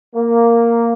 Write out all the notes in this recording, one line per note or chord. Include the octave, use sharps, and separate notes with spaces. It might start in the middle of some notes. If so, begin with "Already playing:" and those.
A#3